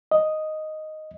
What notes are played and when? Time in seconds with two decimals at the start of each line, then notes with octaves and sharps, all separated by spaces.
0.12 D#5